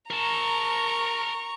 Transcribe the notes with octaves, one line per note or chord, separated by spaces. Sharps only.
A#4 A5 A#5 C#6